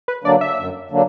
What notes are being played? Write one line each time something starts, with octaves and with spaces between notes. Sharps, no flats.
B4
D3 F#3 A#3 D4 D5
E5
F#2
D3 F#3 A#3 D4